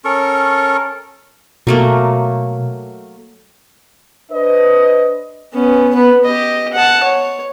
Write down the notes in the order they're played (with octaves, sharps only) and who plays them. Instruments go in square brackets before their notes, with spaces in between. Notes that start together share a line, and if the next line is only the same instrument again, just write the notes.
[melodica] C#4 A4 A#4 C#6
[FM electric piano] B2 [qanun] F#3 A3 A#3
[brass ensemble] D4 B4 C5 D#5
[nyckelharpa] B3 C#4
B3 B4
G4 D#5
F#5 A5
C#5